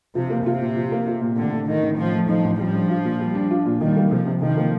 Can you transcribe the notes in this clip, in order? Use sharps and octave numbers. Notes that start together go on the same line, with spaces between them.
C3 F3
A#3
C3 F4
A#2
F3
A#3
F4
A#2
A2 D3
A3
D#3 D#4
A1
A2 F3
A3
F3 D#4
A1
F3 G3
D4
F4
A#2
G3
D4
F4
A#2
D#3 G3
A#3
C3 F3
C3
D#3 F3
A#3